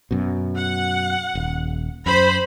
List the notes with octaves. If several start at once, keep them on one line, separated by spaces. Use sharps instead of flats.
F#2 B2
F#5
D#1
F#2 C5 B5